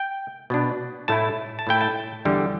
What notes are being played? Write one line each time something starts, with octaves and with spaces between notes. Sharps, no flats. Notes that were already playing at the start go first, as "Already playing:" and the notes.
Already playing: G5
B2 B3 D4
A2 A3 E4 A5
A5
A2 A3 E4 G5
A5
E2 D3 G3